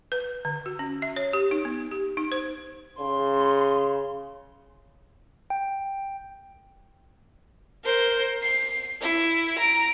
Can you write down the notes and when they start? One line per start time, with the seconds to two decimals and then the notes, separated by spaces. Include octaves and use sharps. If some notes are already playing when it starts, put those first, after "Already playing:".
0.12 B4
0.45 D3
0.66 F#4
0.79 C#4
1.02 E5
1.16 C#5
1.33 G4
1.51 D#4
1.65 B3
1.91 G4
2.17 D#4
2.32 C5
2.99 C#3 C6
5.50 G5
7.84 A#4 C5
8.42 C7
9.01 E4
9.58 A#5 D7